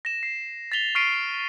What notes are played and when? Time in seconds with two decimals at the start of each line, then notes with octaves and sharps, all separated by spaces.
0.05 A#6 E7
0.23 C7
0.72 A6 B6 F7 G7
0.95 C#6 F6 B6 C7 D7 D#7